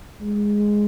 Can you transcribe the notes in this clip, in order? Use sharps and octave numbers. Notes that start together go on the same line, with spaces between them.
G#3